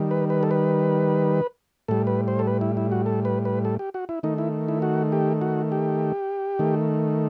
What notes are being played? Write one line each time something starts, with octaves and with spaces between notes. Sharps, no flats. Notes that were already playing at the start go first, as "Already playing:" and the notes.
Already playing: D#3 G3
B4
B4
A4
B4
A2 G3 A4
B4
C5
A4
B4
E4
E4
F#4
A4
B4
B4
A4
G4
F#4
E4
D#3 A3 D#4
E4
E4
F#4
G4
F#4
G4
D#3 A3